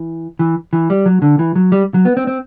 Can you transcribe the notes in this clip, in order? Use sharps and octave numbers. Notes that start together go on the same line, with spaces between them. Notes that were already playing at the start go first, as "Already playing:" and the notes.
Already playing: E3
E3
E3
G3
F#3
D3
E3
F#3
G3
F#3
B3
C4
C4